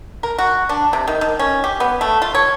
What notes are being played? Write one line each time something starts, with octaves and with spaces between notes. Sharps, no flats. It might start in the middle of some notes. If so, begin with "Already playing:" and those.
A#4
F#4
D4
C3
D#3
D#3
C#4
G4
B3
A3
F4
C#5